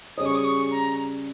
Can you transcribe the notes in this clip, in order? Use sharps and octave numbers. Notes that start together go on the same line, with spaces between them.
C#3 G3 C#4 G#4 C#5 D#6
C#6
D#6
C#6
A#5